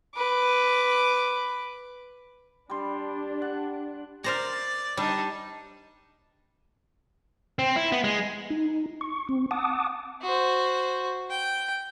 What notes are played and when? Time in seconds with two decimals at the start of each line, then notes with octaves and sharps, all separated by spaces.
0.15 B4 D6
2.70 G3 D4 C6
3.42 F#5
4.24 A#4 C5 D5 A#5
4.97 G3 D4 D#4
7.59 C4
7.76 E4
7.92 B3
8.04 G#3
8.50 D#4
9.01 C#6
9.29 C4
9.51 F#5 A5 D6 D#6
10.22 F#4 C5
11.30 G5